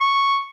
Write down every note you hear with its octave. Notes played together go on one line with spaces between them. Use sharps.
C#6